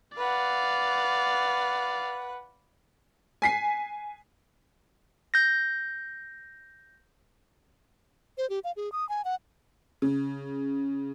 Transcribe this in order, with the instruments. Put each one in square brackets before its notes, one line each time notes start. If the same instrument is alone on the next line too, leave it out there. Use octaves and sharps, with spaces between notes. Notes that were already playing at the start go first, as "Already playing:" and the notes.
[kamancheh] B4 F#5 [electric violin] D5 F5
[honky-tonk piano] G#5 B6 C7
[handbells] G6 A#6
[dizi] C5
G4
F5
G#4
D#6
G#5
F#5
[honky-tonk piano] C#3